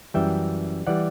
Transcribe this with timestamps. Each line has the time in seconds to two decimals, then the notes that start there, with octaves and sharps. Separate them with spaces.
0.14 F#2 E3 G3 E5 G5
0.87 E3 G3 D5 F#5